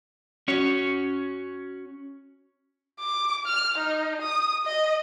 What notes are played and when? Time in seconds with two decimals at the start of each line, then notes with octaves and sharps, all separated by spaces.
0.48 C#4 F#4 C#5
3.00 D6
3.46 F6
3.78 D#4
4.22 D#6
4.66 D#5